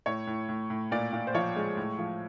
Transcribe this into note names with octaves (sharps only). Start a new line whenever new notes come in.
A2 C#5
A2
A2
A2
A#2 D5
A#2
C5
F3 C#5
G#3
A2
F3